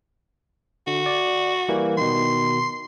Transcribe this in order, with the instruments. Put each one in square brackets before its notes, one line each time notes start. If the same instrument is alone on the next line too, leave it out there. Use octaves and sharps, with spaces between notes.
[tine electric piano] D3 [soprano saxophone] F#4
[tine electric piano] D5
E3 G3 A#3
[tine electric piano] B2 D#3 [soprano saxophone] C6